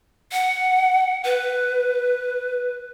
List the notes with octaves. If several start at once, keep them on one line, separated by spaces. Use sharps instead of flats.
F#5
B4